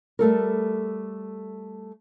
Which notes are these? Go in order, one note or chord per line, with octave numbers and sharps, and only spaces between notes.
G3 A3 A4 A#4